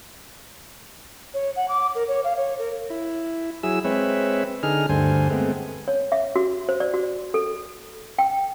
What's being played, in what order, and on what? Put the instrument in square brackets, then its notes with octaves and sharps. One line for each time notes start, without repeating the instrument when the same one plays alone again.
[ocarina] C#5
F#5
D6
A#4
C#5
F5
C#5
A#4
[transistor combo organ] E4
F#3 E4 G#4 E6
G#3 C4 B4 C#5 E5
D3 D#4 G#4 F6
D2 G2 D3 C5 G#5
G#3 A3 B3 C4
[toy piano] C#5
E5
F#4
C5
D5
F#4
A4
G5